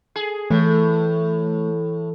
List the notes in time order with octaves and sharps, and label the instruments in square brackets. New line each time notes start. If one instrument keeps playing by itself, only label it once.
[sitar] G#4
[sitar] A2 [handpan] E3 [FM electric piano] A3